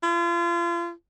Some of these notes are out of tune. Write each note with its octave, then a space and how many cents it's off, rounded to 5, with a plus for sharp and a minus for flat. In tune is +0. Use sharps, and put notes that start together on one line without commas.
F4 -35